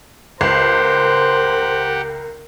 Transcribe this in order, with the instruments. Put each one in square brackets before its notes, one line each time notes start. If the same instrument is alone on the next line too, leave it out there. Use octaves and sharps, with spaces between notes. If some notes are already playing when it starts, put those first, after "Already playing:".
[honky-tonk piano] C#2 [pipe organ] G4 F#5 [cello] A#4 [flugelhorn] C5